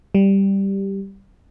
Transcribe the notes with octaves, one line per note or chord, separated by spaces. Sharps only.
G3